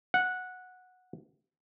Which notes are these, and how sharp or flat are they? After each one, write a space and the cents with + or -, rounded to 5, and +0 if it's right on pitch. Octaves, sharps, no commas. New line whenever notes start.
F#5 -10